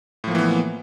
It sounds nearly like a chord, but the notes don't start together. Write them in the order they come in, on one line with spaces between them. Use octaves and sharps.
A2 F3 A#3 E3 B3